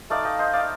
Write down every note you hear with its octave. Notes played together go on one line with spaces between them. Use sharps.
A3 D#4 D5 F5
D#5 G5
C5 D#5
D5 F5